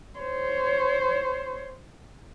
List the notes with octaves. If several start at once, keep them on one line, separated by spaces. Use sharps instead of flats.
C5 C#5